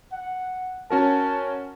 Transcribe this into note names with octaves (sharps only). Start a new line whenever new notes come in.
F#5
C#4 F#4 A#4 A5